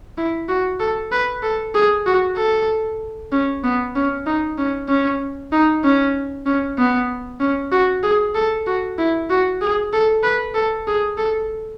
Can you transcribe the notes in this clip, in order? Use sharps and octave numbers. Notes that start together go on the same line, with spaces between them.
E4
F#4
A4
B4
A4
G#4
F#4
A4
C#4
B3
C#4
D#4
C#4
C#4
D#4
C#4
C#4
B3
C#4
F#4
G#4
A4
F#4
E4
F#4
G#4
A4
B4
A4
G#4
A4